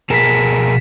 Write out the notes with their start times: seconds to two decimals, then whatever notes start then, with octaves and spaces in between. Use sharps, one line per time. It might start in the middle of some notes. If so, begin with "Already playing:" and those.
0.10 B2 G#4 A#4 B6 E7